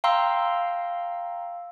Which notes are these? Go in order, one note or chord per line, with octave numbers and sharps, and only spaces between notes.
F5 G5 A#5 C6 E6